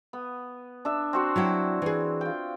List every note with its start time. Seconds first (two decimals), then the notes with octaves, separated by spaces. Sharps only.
0.13 B3
0.85 D4 E5
1.13 C4 F#4 C6
1.36 F#3 E4 G5
1.82 E3 G#4
2.21 F4 G5